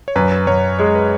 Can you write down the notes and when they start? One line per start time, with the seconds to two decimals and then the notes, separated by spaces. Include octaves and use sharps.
0.08 C#5
0.16 F#2 B4
0.47 F#2 C#5
0.78 G#3 C#5
0.95 B4